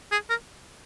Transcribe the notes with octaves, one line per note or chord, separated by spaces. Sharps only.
G#4
A#4